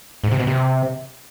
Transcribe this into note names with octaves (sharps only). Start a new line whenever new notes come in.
G#2
C3
B2
C3